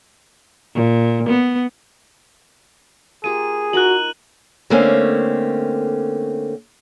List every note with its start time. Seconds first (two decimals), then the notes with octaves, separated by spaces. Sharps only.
0.74 A#2
1.30 B3
3.24 A#3 F4 G4 G#4 D#7
3.73 D#4 F4 F#4 A#4 F#6 F#7
4.70 D3 A3 A#3 C4 C#4